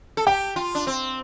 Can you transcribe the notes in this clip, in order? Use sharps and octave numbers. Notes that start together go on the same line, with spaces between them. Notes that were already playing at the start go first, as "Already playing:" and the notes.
A4
G4 G5
F4
D4
C4